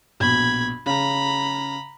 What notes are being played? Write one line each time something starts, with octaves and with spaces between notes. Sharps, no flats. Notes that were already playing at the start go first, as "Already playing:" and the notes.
A#1 B2 B5 G#6
C#3 A#5 B5